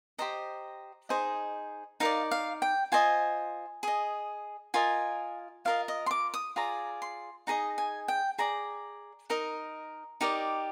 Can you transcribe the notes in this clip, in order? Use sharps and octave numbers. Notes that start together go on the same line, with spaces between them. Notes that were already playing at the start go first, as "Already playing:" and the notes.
G4 C5 D#5 A#5
D#4 G#4 C5 D#5
D#4 A#4 D5 F5
F5
G5
F4 C5 D#5 G#5
G#4 D#5
F4 A#4 D#5 G#5
F4 A#4 D#5 F5
D#5
C6
D6
D#6
F4 G#4 D5 A#5
C6
D#4 G#4 D#5 A#5
G#5
G5
G#4 D5 A#5
D#4 A#4 D#5
D#4 G4 A#4 D5